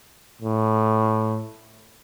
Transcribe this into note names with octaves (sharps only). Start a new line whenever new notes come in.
A2